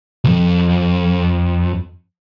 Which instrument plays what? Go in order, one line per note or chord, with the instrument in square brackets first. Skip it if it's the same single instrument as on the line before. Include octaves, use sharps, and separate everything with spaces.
[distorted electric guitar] C2 F2